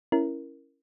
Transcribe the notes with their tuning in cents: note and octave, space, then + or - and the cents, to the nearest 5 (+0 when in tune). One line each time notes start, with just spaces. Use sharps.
C#4 +0 E4 +5 A#4 +0